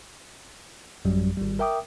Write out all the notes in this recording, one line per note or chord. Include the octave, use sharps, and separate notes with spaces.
A1 F#2 F#3 G3
G#1 G3
A#4 E5 G5 D6 D#6